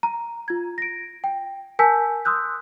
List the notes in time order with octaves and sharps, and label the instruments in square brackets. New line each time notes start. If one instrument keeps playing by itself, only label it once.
[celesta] A#5
F4 G#6
A#6 D7
G5
A#4 G#5 A5 E6 G6 B6
C6 D#6 E6 F#6 G6